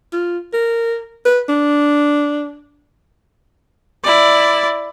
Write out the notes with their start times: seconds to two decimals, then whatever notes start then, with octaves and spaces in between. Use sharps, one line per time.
0.13 F4
0.54 A#4
1.25 B4
1.49 D4
4.04 E4 D5